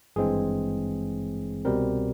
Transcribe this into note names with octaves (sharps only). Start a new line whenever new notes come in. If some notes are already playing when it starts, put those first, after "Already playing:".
G#1 G2 E3 G#3 C4 G#4
C2 B2 G3 C4 A#4